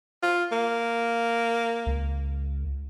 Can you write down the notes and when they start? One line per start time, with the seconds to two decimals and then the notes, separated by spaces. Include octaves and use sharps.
0.23 F4
0.52 A#3
1.86 C#2